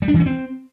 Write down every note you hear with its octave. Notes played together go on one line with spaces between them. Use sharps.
G3
D4
E3
C#4
C4